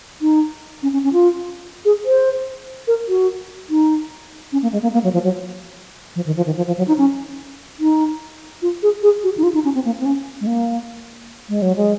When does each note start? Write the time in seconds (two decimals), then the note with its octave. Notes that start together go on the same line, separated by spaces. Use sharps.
0.22 D#4
0.83 C#4
0.93 C#4
1.04 C#4
1.13 F4
1.85 G#4
2.05 C5
2.88 A#4
3.09 F#4
3.70 D#4
4.52 C#4
4.62 A#3
4.73 G#3
4.83 A#3
4.94 A#3
5.04 F#3
5.13 F3
5.24 F#3
6.16 F3
6.26 D#3
6.37 F3
6.46 D#3
6.57 F3
6.67 F3
6.78 F#3
6.88 D#4
6.98 C#4
7.80 D#4
8.62 F4
8.83 G#4
9.03 G#4
9.24 F#4
9.37 D#4
9.43 F4
9.54 D#4
9.65 C#4
9.75 C4
9.85 A#3
10.00 C4
10.06 C#4
10.41 G#3
10.47 A#3
11.49 G#3
11.62 F#3
11.76 G#3